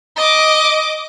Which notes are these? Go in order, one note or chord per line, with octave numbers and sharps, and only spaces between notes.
D#5 D6